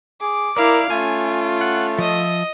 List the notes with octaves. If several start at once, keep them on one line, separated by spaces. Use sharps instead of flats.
G#4 D6
E4 A#4 D5 F5
A3 C#4 F4 G#5
F#5
F3 D#5 E5